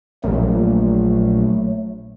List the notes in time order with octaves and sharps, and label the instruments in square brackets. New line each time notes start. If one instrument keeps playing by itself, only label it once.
[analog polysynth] A#1 [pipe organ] F#3 A3